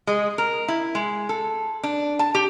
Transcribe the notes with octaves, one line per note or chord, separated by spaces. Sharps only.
G#3
A#4
E4
G#3
A4
D4
A5
G4